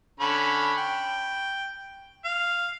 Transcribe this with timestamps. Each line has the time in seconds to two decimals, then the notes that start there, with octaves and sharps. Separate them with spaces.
0.20 D3 C#4 B5
0.77 G5
2.25 F5